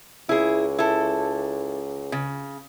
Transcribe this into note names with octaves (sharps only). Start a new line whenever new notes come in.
C#2 E4 G#4
E4 A4
C#3